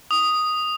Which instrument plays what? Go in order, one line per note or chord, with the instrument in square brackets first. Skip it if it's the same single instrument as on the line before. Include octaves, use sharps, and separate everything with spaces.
[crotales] D#6